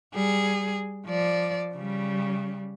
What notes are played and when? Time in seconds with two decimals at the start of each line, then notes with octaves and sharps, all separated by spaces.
0.14 G3 G#4
1.06 F3 D5
1.75 C#3 G3